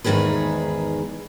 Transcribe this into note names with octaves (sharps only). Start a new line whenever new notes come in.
E2 G#2 B2 D#3 G#4 B4